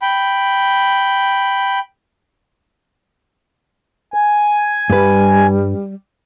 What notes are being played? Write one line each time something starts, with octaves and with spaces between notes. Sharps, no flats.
G5 B5
G#5
G2 G3 B4